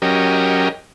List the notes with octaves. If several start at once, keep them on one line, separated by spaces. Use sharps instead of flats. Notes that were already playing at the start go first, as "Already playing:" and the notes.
F#3 C#4 G4 A#4 D#5